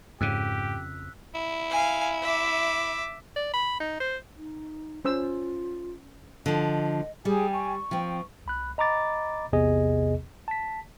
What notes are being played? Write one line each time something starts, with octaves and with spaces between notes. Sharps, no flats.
F2 G#2 C#3 G4 E6 F#6 B6
E4
F5 G#5
E5 D6
D5
B5
D#4
C5
D#4
C#4 F4 C5 E6
D3 F3 D#5
G3 G#4 G5 G#5
C#6
F3 C4 G5
C2 B5 F#6
D#5 A#5 B5 D6 A6
A#1 E2 C3 B3 G#4 D#5
A5 B6